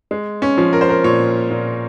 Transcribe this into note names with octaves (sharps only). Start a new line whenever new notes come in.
G#3
C#4
F3
A#4
C5
A#4
A#2 C#5
A#2